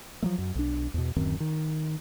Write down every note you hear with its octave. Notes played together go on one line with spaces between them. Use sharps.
F3 F#3 A3
F#2
B1 D4
E2 B2
D1 F#2 D#3 C4
D#3